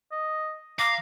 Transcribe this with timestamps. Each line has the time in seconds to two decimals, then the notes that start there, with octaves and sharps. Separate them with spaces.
0.12 D#5
0.79 F5 A#5 D6